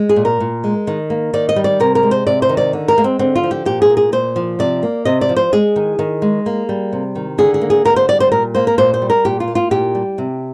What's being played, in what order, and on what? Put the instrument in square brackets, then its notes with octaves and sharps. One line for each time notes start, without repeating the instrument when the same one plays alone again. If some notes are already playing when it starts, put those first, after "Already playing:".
Already playing: [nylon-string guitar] G#3
G#4
A#2
A#4
A#2
G#3
D#3
A#3
D#3 D5
D#5
G3
D5
C3 A#4
A#4
G#3
C5
C3 D5
C5
D#3
D5
D3
A#4
G#3 A#3
C4
D3 C4
F4
F3
G4
A#2 G4
G#4
A#3
G#4
A#2 C5
F3
C3 D5
A#3
C3 D#5
D5
F3
C5
G#3 G#4
D#3
D#3
G#3
A#3
G3
C3
D#3
D3 G#4
G#4
A#3
G#4
D3 A#4
C5
G3 D5
C5
A#2 A#4
A#3 C5
A#4
A#2 C5
C5
G3
A#4
A#2 G4
F4
A#3
F4
A#2 G4
G3
C3